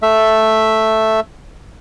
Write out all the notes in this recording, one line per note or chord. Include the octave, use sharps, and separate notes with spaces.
A3 E5